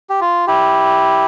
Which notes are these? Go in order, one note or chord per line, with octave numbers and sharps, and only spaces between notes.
G4
F4
E4 G4